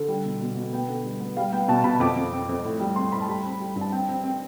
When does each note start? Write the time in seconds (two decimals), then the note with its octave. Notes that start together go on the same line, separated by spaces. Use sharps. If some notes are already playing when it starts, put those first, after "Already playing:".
Already playing: D3
0.08 G3
0.25 B2
0.40 B2
0.57 B2
0.73 B3 G5
0.89 D3
1.04 G3
1.20 B3
1.37 G3 F5
1.52 B3 G5
1.68 B2 A5
1.84 B2 B5
2.00 F2 D6
2.16 F2
2.33 C4
2.49 F2
2.64 A2
2.80 G3
2.96 C4 C6
3.12 A2 B5
3.21 A5
3.28 G3 B5
3.45 C4
3.60 G3
3.76 G2
3.81 A5
3.92 C4 G5
4.08 C4
4.24 C4